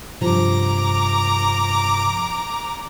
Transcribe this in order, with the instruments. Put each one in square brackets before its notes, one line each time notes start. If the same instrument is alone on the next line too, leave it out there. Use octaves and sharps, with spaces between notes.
[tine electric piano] G2 C3 F3 [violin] A#5 D6